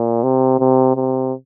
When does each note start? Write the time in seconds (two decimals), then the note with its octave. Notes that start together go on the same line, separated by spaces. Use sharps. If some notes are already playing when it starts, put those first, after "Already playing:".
Already playing: A#2
0.23 C3
0.60 C3
0.95 C3